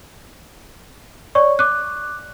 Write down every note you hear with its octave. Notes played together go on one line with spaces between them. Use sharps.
C#5 D5 C#6
D6 F#6